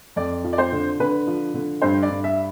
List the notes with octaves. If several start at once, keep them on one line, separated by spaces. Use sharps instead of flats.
F2 D5
F3
D5
C5
D3
D3 B4
F3
D3
G2 C5
D5
G2
E5